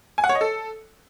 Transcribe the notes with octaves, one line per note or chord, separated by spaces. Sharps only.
G#5
F#5
C#5
D#5
A4